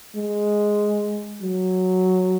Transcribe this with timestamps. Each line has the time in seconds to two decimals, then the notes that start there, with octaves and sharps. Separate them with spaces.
0.16 G#3
1.42 F#3